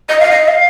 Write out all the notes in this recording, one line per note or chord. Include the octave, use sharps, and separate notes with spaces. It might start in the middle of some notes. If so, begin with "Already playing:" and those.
D#5
F5
D#5
F5